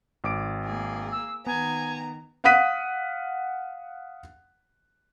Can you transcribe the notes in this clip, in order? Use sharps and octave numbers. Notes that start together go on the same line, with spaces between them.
G#1 D6 D7
A#3 G#4
E6
D#3 B3 G#5 A#5
F5 F#5 D#6 F#6 B6 D#7